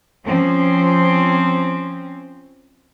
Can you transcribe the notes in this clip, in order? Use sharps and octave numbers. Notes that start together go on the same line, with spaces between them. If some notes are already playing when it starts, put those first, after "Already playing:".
F3 C4 C#4